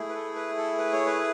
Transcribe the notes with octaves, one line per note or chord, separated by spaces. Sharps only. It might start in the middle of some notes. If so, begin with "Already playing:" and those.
Already playing: A3 E4 G#4
B4
A4
B4
A4
B4
C#5
B4